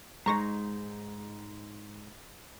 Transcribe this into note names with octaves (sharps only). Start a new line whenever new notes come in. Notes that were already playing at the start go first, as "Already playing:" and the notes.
G#2 G#3 D#4 A#5 C#6 A#6